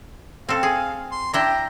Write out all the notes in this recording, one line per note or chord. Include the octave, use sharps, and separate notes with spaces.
C4 A4 F5
G#4
C6
D4 E4 G5 A#5